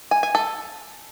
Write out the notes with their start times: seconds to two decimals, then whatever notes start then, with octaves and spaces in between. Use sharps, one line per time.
0.11 G#5
0.23 G#5
0.35 A4